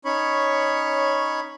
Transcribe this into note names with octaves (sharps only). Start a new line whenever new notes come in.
C#4 D#4 C#5 B5 C#6